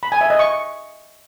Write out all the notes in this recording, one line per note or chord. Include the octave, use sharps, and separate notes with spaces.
B5
G#5
E5
D#5
C#6